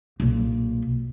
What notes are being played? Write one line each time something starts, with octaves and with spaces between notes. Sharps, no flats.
B1 A#2